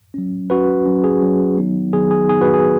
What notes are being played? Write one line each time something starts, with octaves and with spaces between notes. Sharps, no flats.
F#3 C#4
F#3 C#4 F#4 B4
F#3 C#4
G#4
F#3 C#4
D#3 F#3 B3 D#4
D#3 F#3 B3 D#4 G#4
G#4
D#3 F#3 B3 D#4 G#4
F#4 B4
G#4